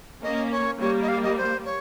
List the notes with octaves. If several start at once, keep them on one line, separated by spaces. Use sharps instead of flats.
A#3 C#4 D#5
C#5
G3 A#3 C#5
D#5
F5
D#5
C5
C#5